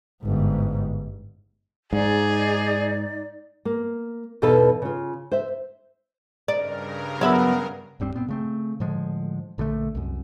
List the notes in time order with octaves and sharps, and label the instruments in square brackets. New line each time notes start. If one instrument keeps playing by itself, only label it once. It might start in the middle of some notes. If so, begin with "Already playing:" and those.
[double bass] G1 G#2
[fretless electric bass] G#2 [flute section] D#4 D5 [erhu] G#4
[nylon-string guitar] A#3
E2 B2 D#4 A4 B4 F5
C#3 F4
C5 E5
[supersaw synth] G2 C#3 A#4 [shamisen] D#4 [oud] D5
[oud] F#3 [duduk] B3 [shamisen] C#5 E5 B5
[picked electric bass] D1 G2 G3 C4
A#2 B3 C4
C#3 A3 C4
A2 D3 F3 G#3
A#1 D3 F3 A3
C2 F#2